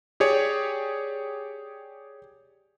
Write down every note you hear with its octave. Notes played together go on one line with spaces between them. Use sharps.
G4 G#4 C#5 D5